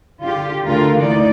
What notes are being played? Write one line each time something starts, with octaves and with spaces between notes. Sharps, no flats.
D3 F4 G4
D2 D3 F4 A#4 F5
D2 E3 A#3 D#4 D5